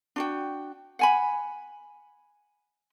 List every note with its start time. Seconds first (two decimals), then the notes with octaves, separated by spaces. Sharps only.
0.16 D4 F#4 G5
0.99 F#5 G#5 B5